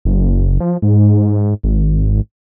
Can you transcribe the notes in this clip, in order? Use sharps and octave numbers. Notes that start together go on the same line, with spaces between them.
F#1
F3
G#2
G#1